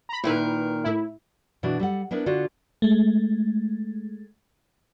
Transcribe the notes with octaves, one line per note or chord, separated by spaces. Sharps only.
A#5 B5
A#2 D#3 E4 A#4 B4
A2 E4
B2 E3 D4 E4 F#4
G3 A4 F#5
B3 D4 E4 A#4
D3 F4 F#4
G#3 A3